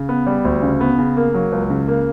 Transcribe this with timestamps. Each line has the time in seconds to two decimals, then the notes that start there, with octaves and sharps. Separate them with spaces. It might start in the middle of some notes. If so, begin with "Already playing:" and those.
Already playing: C#3
0.09 B3
0.27 G3
0.45 D2
0.62 C#3
0.81 B3
0.99 C#3
1.17 A#3
1.34 F#3
1.52 C#2
1.70 C#3
1.88 A#3